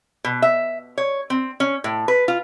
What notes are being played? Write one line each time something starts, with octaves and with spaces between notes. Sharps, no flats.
B2
E5
C#5
C4
C#4
A2
B4
F4